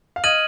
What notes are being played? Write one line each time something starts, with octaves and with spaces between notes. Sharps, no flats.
F5
D#5 F6 G#6 D#7 F#7